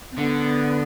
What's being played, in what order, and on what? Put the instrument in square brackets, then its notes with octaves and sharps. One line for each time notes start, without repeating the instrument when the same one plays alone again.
[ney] C4
[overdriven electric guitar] D3 [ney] B3